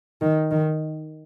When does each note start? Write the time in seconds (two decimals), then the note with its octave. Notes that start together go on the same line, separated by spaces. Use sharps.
0.21 D#3
0.51 D#3